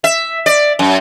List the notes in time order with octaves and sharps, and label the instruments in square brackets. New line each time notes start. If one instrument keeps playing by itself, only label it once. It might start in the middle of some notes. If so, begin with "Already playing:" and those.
[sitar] E5
D5
F#2